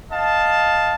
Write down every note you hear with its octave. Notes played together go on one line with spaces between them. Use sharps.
D#5 F5 A5